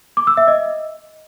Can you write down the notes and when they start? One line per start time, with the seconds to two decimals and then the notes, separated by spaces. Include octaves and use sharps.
0.17 D6
0.27 E6
0.37 E5
0.48 D#5